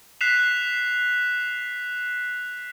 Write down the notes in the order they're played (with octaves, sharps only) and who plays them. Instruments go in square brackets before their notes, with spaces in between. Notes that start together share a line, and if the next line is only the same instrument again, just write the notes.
[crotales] F#6 B6 C7 E7 F7